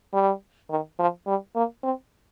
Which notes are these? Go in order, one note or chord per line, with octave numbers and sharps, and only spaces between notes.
G3
D#3
F3
G3
A#3
C4